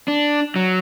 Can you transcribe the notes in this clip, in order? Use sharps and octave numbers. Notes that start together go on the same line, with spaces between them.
D4
F#3